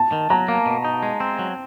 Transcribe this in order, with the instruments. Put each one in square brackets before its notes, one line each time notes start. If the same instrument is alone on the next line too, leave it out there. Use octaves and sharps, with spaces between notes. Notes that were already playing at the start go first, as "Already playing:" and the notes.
Already playing: [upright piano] A5
[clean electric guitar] D#3
[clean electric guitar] F#3 [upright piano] A#5
[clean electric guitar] A#3
B2
D#4
G#3
C4
F#3